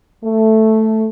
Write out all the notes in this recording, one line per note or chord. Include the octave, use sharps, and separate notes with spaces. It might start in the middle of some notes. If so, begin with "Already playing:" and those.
A3